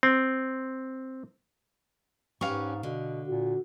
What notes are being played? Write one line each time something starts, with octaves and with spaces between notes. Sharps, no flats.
C4
G#2 C#4 G4 B4 F5 C#6
B2 D3
A#2 F#4